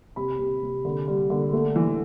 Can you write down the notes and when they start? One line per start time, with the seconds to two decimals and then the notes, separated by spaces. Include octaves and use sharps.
0.16 C3 B5
0.39 C3
0.63 C3
0.85 D3
1.08 G3
1.30 D3
1.53 A3
1.76 E3